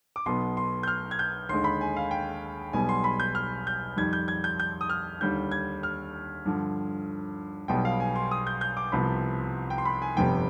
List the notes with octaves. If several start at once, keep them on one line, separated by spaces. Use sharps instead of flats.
D6
B1 B2 B3 C6
C6
G6
F6
G#6
G6
D#2 D3 G#3 C6
B5
G#5
F5
G5
B1 B2 G3 B3 G#5
C6
B5
G6
F6
G6
F2 D#3 G3 G#6
G6
G#6
G6
G6
D#6
F6
D#2 D3 G3 G6
G#6
F6
G2 D3 F3
B1 B2 G3 B3 G5
F5
G#5
C6
D#6
G6
G6
D6
C2 C3 F3 B3 B5
G5
C6
B5
G#5
G1 F2 C3 G3 B3 G5